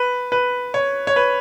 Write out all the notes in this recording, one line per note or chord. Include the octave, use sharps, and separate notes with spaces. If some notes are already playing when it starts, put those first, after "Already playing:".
Already playing: B4
B4
C#5
C#5
B4